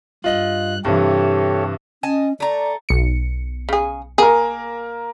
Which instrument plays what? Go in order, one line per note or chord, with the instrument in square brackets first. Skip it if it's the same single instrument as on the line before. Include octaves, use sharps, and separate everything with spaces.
[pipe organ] G2 F#6 [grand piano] F4 D#5 F#7
[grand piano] G2 C3 E3 [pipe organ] G4 A4 C#5
[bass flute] C#4 [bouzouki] D#5 G#5 A5
[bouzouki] A3 A#5 [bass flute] D5
[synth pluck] B1 C#7
[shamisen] C#3 G#4
[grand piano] A#3 A#4 [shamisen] G#4